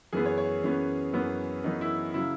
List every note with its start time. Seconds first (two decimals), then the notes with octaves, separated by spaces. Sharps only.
0.13 F#2 E3 B3 G#4
0.26 C#5
0.38 C#5
0.64 F#2 E3 B3 C#4
1.14 F#2 E3 B3
1.64 F#2 E3 B3 D#4
1.81 E4
2.14 C#3 F#3 E4